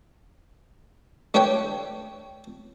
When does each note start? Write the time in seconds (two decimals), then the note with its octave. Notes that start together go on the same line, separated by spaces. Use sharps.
1.34 A3 D4 G4 B4 C#5 G5